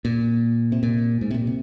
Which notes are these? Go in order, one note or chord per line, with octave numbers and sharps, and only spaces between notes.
A#2
C3
A#2
G#2
C3
A#2
C3